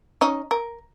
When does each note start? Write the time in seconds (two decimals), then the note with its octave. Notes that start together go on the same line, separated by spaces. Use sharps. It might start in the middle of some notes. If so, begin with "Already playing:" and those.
0.21 C#4 D#4
0.51 A#4